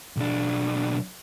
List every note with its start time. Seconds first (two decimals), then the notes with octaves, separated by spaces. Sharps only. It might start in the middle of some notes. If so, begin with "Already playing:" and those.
0.17 B1 D4